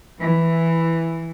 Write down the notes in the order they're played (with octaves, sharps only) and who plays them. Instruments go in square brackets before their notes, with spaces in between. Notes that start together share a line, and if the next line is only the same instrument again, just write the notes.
[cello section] E3